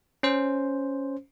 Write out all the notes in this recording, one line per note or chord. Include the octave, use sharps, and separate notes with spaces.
C#4 C5